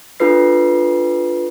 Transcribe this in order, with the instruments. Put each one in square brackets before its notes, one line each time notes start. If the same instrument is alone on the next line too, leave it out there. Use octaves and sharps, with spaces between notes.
[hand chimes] D4 F4 A4 B4 C7